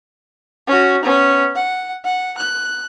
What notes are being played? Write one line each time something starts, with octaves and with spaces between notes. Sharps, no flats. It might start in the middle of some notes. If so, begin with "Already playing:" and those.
C#4 F#4
B3 C#4
F#5
F#5
F#6